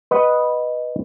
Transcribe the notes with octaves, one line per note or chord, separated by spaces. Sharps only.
B4 D#5 F#5